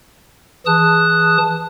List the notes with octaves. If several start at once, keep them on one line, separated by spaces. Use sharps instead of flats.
E3 G#4 A5 D#6 F#6